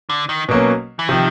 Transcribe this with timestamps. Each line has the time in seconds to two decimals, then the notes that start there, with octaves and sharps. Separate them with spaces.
0.10 D3
0.29 D#3
0.49 B2 F#3 A#3 C#4
0.99 E3
1.08 C3 D#3 F3